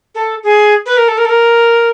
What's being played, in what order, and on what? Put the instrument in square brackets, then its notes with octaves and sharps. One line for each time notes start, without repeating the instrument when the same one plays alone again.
[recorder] A4
G#4
B4
A#4
A4
A#4
A4
A#4